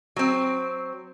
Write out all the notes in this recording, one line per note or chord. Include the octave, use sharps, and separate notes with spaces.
F#3 C4